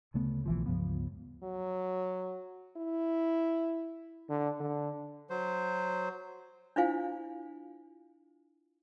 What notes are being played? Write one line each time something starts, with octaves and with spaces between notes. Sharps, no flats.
D2 C#3 A3 B3
B1 E3 F3
C#2 G2 F3 B3
F#3
E4
D3
D3
F#3 C5
D4 E4 F4 C5 F5 G#5